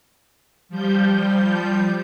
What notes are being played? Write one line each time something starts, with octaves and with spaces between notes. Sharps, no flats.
F3 G3 G6